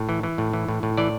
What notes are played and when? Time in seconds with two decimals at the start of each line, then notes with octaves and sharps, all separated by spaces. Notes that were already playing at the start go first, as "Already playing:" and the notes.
Already playing: A2
0.09 E3
0.23 E3
0.38 A2
0.53 E3
0.68 A2
0.83 A2
0.97 E3 D5